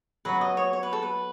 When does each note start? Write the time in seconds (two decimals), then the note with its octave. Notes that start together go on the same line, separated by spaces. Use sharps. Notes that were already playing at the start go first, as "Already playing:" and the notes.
0.25 F#3 B3 F#4 B4
0.41 D#5
0.57 C#5
0.73 C#5
0.83 B4
0.93 A4
1.02 B4